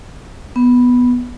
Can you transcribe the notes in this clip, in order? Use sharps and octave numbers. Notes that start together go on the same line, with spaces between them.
B3